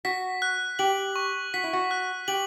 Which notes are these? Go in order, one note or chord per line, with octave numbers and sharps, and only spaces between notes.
F#4 B6
F#6
G4 F#7
C#6
F#4 B6
E4
F#4
F#6
G4 F#7